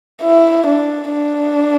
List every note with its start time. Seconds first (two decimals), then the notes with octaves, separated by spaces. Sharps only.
0.22 E4
0.67 D4
1.11 D4